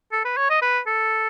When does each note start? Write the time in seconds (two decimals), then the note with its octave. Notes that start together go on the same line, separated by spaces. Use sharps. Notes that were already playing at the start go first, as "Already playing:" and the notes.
0.12 A4
0.25 B4
0.37 C#5
0.50 D#5
0.62 B4
0.87 A4